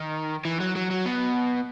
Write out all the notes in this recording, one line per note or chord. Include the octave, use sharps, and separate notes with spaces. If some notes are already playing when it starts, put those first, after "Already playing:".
Already playing: D#3
E3
F#3
F#3
F#3
B2